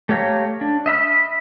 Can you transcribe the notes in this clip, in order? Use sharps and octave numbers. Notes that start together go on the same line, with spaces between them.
A3 G4 C#5 F5 A#5
D4
D#5 E5 B5 F6